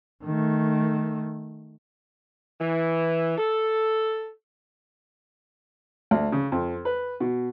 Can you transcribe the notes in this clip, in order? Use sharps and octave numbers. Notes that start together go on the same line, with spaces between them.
D#3 A3
E3
A4
D2
C#3
F2
B4
B2